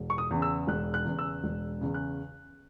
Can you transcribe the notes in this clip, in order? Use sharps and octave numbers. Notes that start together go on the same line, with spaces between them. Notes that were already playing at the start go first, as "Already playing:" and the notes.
Already playing: E1
C#6
D#6
E2 C#3
E6
E1 F#6
F#6
E2 C#3
E6
E1
E2 C#3
F#6